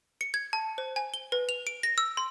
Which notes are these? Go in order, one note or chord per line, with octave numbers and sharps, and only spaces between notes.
C#7
G#6
A5
C5
G#5
G7
B4
F7
D7
A#6
E6
C6